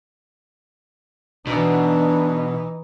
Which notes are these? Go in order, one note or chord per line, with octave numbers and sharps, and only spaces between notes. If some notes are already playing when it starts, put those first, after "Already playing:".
B2 E3 D4 D#4